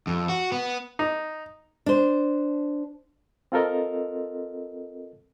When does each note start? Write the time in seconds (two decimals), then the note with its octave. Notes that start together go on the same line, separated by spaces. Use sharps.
0.07 F2
0.29 F#4
0.52 B3
0.99 D#4
1.86 D4 C5
3.52 C4 F4 A4 A#4 D#5